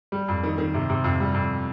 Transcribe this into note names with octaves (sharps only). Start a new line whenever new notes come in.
G3
F2
D#3
D#3
C3
C3
F2
G3
F2